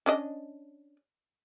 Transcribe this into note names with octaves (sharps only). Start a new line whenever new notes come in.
C#4 D4 D#5